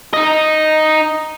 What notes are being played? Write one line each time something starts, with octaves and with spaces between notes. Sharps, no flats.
D#4 D#5